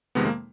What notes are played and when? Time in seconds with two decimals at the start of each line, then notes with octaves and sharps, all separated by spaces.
0.15 F2 C3 D#3 G#3 B3
0.26 A#3